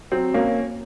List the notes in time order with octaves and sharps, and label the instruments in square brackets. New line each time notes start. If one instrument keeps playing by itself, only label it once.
[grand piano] F#3 [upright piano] C4
[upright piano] A#3 [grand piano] C#4